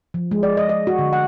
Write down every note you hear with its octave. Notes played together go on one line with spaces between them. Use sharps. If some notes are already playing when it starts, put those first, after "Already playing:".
F3
G#3
D5
D#5
D#5
F#4
D3
F#5